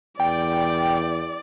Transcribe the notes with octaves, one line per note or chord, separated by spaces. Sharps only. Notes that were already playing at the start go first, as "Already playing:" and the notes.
E2 D5 G5